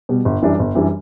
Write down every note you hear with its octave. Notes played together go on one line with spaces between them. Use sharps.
B2 G3
G1
F#2 E3 G3 D4
G1
F#2 E3 G3 D4